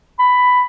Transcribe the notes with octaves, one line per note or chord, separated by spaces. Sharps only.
B5